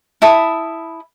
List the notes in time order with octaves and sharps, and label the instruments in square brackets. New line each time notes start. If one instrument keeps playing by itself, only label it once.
[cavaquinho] E4 E5 A5 D#6